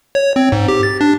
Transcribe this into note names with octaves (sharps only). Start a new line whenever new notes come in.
C#5
C4
G#2
G4
A6
D4